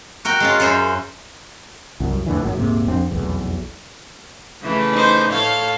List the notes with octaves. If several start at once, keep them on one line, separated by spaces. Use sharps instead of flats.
F#4 A#4 G5
G#3 C#4 F4
F#2 C#4 C5 E5
C2 F#2
E2 A2 D3 E3
G#1 F#2 D#3 F#3
D#1 G#2 C3 A#3
F2 C4 D4
F1 B1 E2
C#3 E3 A3
D#4 C5
A2 A4 C#5 F5